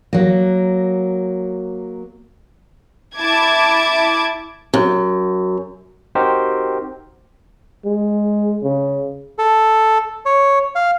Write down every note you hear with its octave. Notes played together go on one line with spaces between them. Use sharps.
F#3 A#3
E4 A5 D6 G#6
F#2
C4 D#4 F#4 G4 A#4 C5
G#3
C#3
A4
C#5
F5